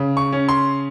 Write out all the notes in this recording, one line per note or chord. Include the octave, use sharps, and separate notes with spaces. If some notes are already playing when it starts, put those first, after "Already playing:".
Already playing: C#3
C#6
C#4
C6